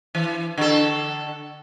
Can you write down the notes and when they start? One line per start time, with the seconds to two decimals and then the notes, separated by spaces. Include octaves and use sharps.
0.15 E3
0.58 D3 A4